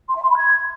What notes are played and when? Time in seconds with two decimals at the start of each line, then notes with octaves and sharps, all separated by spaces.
0.09 C6
0.15 E5
0.22 C6
0.29 B5
0.36 G#6